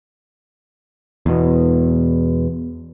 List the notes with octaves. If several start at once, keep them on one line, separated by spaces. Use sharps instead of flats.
E2 B2